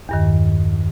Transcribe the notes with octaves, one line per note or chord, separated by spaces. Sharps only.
E2 G2 D#3